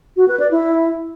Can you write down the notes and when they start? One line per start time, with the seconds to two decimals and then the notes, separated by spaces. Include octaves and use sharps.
0.17 F#4
0.28 B4
0.40 D5
0.51 E4